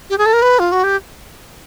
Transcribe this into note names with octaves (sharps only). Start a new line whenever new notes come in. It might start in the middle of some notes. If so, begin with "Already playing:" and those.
G4
G#4
A4
A#4
B4
F4
F#4
G4